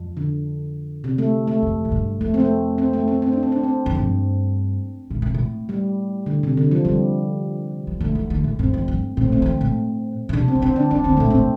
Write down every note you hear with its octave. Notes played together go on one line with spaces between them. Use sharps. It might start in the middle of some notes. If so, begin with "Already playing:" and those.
Already playing: F2
D3
C3
A3
A3
F2
A2
G2
F2 A3
C4
A3
C4
A3
C4
C4
D4
C4
D4
C4
F2
G2
A2
C3
A2
G3
D3
C3
D3
F3
C3 G3
F3
D3 A3
D3
D3
A2
G2 C4
F2
G2
A2 C4
A3
D3 C4
F3
D3
A2
A2
C3 D4
C4
F3
D3 C4
D4
D3 D4
D3 C4
A2 A3
C3 C4